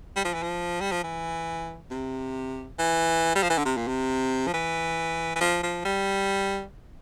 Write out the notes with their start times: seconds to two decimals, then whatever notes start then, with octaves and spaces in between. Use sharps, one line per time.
0.16 G3
0.25 F3
0.34 E3
0.43 F3
0.81 G3
0.91 F3
1.04 E3
1.91 C3
2.79 E3
3.35 G3
3.43 F3
3.50 E3
3.58 D3
3.65 C3
3.77 A#2
3.88 C3
4.47 F3
4.53 E3
5.35 E3
5.40 F3
5.63 F3
5.85 G3